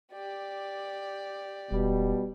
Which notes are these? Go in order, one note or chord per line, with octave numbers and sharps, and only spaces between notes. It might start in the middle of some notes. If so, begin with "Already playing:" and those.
G4 D5
E1 B2 G3